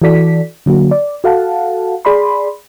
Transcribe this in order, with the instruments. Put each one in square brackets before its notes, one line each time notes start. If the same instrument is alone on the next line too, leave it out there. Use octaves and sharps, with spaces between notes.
[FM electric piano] E3 F#4 A4 D5 B6
D3 F#3 A#3 F#4
D5
F#4 A4 F5 F#5 A5
G#4 D5 B5 C6